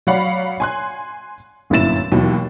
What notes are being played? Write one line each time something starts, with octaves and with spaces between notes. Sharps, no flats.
F#3 C#5 D5 F5 F#5 B5
G#5 C6 F#6
G1 F#2 A#2 E4 A6 E7
D#2 B2 E3 F#3